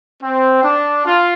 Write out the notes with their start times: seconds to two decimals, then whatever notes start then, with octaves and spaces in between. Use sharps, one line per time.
0.22 C4
0.63 D4
1.05 F4